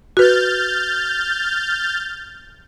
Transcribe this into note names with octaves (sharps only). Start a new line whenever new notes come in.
F#4 B4 F6 G6 A6